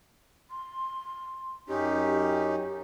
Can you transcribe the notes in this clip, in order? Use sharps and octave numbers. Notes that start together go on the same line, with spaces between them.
C6
F#2 C#4 D#4 G4